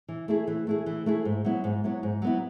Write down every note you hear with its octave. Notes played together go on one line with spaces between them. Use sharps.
E3
A3 E4 G#4
E3
A3 E4 G#4
E3
A3 E4 G#4
G#2
F#3 B3 E4
G#2
F#3 B3 E4
G#2
F#3 B3 E4